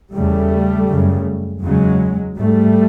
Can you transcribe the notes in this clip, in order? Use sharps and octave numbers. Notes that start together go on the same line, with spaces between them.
E2 C#3 G3 A3
F#2 C#3
E2 C#3 F#3 G#3
G#2 G3 A3